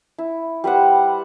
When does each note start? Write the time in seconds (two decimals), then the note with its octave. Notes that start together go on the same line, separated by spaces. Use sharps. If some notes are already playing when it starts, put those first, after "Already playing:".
0.18 E4
0.64 G3 B4 C5 F#5